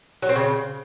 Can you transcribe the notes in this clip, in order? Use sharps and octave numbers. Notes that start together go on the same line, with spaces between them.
F#3
C4
C#3